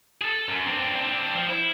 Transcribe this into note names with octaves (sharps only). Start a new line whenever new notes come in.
G#4 A4
F#2
C4 D4
C4 D4
F3
E4